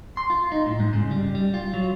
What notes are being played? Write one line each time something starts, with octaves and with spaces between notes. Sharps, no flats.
C6
F4
D#4
A2
G#2
C#3
G3
G3
F4
F#3